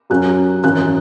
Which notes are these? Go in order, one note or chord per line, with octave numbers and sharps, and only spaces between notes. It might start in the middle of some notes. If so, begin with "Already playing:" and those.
F#2 F#3 C#4 F#6
G#1 F#2 E3 C#4 F#6